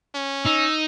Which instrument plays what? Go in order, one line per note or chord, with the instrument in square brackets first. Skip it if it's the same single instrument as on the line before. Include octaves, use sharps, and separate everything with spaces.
[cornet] C#4
[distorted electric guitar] D#4 [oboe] E6